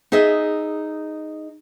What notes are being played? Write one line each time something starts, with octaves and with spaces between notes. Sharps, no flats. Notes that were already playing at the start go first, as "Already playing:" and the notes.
D#4 G#4 D#5 E5